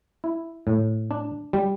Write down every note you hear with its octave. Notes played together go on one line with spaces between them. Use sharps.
E4
A2
D4
G3